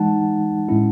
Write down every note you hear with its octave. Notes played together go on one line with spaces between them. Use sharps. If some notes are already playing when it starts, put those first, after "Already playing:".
Already playing: E3 G#3 D#4 F#5 A5
A2 G#3 C#4 E4